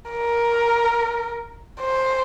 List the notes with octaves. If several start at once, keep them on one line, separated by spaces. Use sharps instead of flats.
A#4
C5